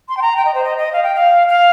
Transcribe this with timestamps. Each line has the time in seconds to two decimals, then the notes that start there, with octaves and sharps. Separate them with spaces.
0.08 C6
0.17 G5
0.22 A#5
0.36 G5
0.45 D#5
0.54 C5
0.64 D#5
0.78 D#5
0.92 F5
1.03 G5
1.15 F5
1.48 F5